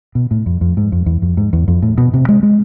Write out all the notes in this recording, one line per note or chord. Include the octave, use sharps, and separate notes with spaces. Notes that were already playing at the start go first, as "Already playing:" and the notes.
B2
A2
F2
F2
G#2
F2
E2
F2
G#2
E2
F2
A2
B2
C3
G#3
G#3